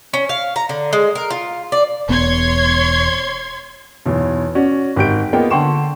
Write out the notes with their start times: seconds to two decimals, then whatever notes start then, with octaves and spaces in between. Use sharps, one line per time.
0.14 C#4
0.29 F5
0.56 A#5
0.69 D3
0.93 G#3
1.15 A#4
1.30 F4
1.72 D5
2.09 E1 B3 C#5 C6 G#6
4.06 B1 E2
4.55 C#4 F#4 D5
4.96 G#1 G4 G6 D7
5.33 A#3 B3 F4 G#4 D#5 G5
5.51 D3 F#5 G5 C6 C#6 E7